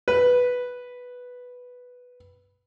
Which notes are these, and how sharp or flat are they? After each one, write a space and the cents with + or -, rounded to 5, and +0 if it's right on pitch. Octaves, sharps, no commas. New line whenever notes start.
B4 +0